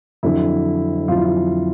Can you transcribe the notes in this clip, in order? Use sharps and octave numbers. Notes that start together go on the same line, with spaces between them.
F2 D3 F#3 E4
F2 D3 F#3 F4
E4
F4